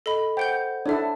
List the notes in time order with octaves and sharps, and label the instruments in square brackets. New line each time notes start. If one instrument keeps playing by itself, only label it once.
[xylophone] A4 D#5 B5
[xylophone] C5 F#5 G6 [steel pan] G5
[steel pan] D4 E4 A4 [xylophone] C#5 E5